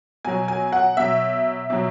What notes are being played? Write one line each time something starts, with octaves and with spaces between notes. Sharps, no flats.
B2 F#3 G#5
G#5
F#5
B2 F#3 E5
B2 F#3